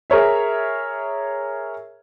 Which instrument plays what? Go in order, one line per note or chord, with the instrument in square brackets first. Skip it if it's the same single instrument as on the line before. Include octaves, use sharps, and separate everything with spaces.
[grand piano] G#4 A#4 C#5 E5